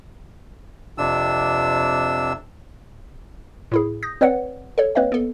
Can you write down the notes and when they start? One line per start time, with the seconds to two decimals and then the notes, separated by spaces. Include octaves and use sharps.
0.98 F2 C3 D4 E6
3.72 A2 E4 G#4
4.03 D#6 G6 A#6
4.21 C4 B4 C#5 D5 F#5
4.78 A4 C#5
4.95 A#3 C4 B4 C#5 D#5 F5
5.12 B3 A4